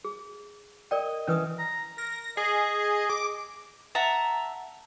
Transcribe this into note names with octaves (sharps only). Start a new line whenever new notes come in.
G#4
A#4 D5 D#5 G5
E3 C#4 B4 D#6
A#5
A#4 A#6
G#4 D#5
D6
E5 F#5 A5 A#5